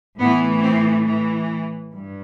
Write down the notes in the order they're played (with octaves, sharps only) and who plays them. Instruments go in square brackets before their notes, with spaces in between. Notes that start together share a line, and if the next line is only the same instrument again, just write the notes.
[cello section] A2 E3 B3
C4
E3
G2